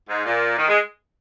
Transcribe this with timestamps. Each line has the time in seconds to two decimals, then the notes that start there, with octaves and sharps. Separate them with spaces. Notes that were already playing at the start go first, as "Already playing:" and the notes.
0.09 G#2
0.25 A#2
0.58 D#3
0.68 G#3